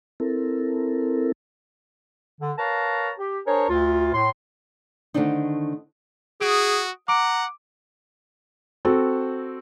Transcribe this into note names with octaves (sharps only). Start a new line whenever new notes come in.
C4 E4 A4 A#4
D3
A#4 B4 C#5 F5 A5 A#5
G4
D4 G#4 A#4 C5 C#5
D2 F4
A2 C6
D3 D#3 A3 C4 D4 D#4
F#4 G#4 D#6 D7
F#5 A#5 D6 D7
C4 F#4 A4